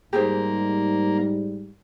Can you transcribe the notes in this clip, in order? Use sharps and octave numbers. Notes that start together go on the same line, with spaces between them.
G#2 G3 A#3 G4 G#4 C5